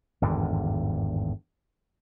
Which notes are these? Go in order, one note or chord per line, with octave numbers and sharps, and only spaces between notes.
G#1 E2 G2 D3